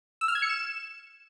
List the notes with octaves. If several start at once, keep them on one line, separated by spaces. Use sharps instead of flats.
E6
F6
G#6
C#7
E7